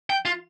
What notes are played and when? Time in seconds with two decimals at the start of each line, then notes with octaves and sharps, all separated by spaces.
0.10 G5
0.25 F4